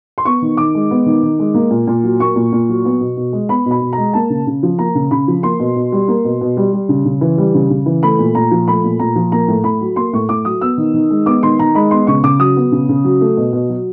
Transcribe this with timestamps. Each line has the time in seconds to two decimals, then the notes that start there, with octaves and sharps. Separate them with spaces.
0.18 C6
0.25 B3 C#6
0.42 D#3
0.57 D#3 D6
0.75 G#3
0.91 B3
1.06 D#3
1.23 D#3
1.39 G#3
1.54 A#3
1.71 A#2
1.87 A#2
2.03 F#3
2.20 A#3 C#6
2.36 A#2
2.52 A#2
2.69 F#3
2.85 B3
3.01 B2
3.17 B2
3.33 G#3
3.49 B3 B5
3.66 B2
3.71 B5
3.81 B2
3.93 G#3 A#5
4.13 A#3 A5
4.30 C#3
4.47 C#3
4.63 F3
4.78 A#3 A#5
4.95 C#3
5.11 C#3 B5
5.28 F3
5.43 A#3 C6
5.60 B2
5.76 B2
5.92 G3
6.08 A#3
6.24 B2
6.41 B2
6.57 G3
6.73 G3
6.89 C#3
7.05 C#3
7.21 E3
7.38 G3
7.54 C#3
7.70 C#3
7.86 E3
8.03 A3 B5
8.19 A#2
8.35 A#2 A#5
8.51 F3
8.68 A3 B5
8.84 A#2
8.99 A#2 A#5
9.16 F3
9.32 A#3 A#5
9.48 A2
9.64 A2 B5
9.81 F#3
9.96 A#3 C6
10.13 A2 C#6
10.29 A2 D6
10.45 F#3 D#6
10.61 B3 E6
10.77 D#3
10.94 D#3
11.10 G#3
11.26 B3 D6
11.43 D#3 C6
11.59 D#3 A#5
11.75 G#3 B5
11.91 B3 C6
12.07 C#3 C#6
12.23 C#3 D6
12.39 F#3 D#6
12.56 B3
12.72 C#3
12.89 C#3
13.04 F#3
13.21 A3
13.37 B2
13.53 B2
13.69 F#3